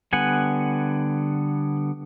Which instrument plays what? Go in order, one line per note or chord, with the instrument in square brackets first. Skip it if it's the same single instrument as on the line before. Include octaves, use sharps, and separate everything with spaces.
[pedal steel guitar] D3 G3 B3 F#5 G#5